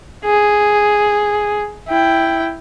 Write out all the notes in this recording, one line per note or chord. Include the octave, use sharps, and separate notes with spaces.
G#4
E4 G5